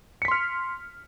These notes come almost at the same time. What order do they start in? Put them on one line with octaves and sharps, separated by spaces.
C#7 B6 C6 F6